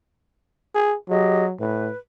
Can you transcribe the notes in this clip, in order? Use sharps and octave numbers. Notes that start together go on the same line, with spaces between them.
G#4
F#3 G4 G#4 D#5
A2 B4